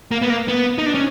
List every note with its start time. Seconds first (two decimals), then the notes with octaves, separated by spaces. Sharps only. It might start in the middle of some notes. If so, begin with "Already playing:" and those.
0.11 A#3
0.22 B3
0.30 A#3
0.48 B3
0.78 D#4
0.86 D4
0.95 C#4